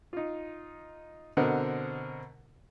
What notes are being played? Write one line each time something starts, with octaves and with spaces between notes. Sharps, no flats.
D#4 F4
B2 D3 C4 A#4 D#5 F#5